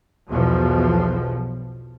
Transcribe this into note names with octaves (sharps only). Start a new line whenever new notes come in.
B1 E2 B2 F3